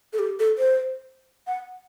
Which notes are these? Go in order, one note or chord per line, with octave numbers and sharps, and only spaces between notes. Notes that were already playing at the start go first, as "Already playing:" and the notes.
A4
G4
A4
C5
F#5